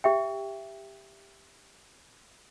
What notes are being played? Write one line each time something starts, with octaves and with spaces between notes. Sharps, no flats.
G4 E5 G5